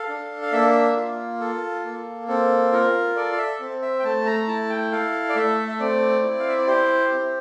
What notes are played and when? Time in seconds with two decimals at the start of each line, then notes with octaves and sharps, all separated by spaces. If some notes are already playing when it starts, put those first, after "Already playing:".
Already playing: A4 F5
0.08 D4
0.42 F5
0.52 A#3 E5
0.96 F4
1.40 A4
1.84 A#3
2.28 C4 A4
2.72 F4 A#4
3.16 A4 D5
3.32 F5
3.38 E5
3.60 C4
3.82 E5
3.99 G5
4.04 A3 A5
4.26 A#5
4.48 E4 A5
4.70 G5
4.92 A4 F5
5.29 D5
5.35 A3 E5
5.68 E5
5.80 C4 D5
6.23 E4
6.39 F5
6.49 E5
6.58 D5
6.67 G4 C5
7.12 C4